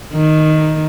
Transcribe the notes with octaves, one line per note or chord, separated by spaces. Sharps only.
D#3